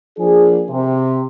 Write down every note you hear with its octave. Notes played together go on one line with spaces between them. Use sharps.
F3 A#3 D4 G#4
C3